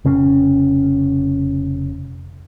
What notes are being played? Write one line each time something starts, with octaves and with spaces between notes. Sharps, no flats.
F1 C#3 C#4